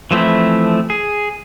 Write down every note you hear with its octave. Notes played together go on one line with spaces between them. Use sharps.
E3 F3 A3 C4 E4
G#4